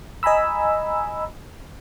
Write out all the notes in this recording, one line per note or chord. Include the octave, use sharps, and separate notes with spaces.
D#5 G#5 A#5 B5 E6